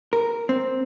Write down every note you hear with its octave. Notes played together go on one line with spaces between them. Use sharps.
A#4
C4